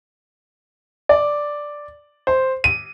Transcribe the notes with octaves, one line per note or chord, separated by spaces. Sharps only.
D5
C5
D#7